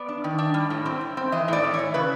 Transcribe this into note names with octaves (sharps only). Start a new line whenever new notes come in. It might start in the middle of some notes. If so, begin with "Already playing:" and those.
Already playing: B3 D5
D4
D#3
D4
G3
A2
C4
A2
C4
E3 D#5
A2 D5
A2
C#5
E3
C#3 B4